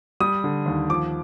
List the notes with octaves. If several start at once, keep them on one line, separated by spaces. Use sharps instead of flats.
G3 D#6
D3
D#2
F3 D6